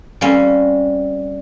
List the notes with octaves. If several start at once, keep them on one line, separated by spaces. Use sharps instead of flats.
G3 A#3 C4 C#4